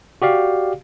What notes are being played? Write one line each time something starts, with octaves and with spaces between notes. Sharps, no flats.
F#4 G4 D5 F5